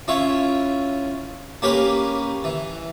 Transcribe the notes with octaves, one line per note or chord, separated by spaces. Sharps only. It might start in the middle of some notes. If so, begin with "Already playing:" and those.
C#4 E4 F4 C#5
A#3 C#4 G4 A#4 B4
E3